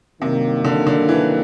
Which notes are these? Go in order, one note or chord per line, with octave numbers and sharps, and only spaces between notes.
G2 C3 D#3 F#3 A#3
D3
D3
E3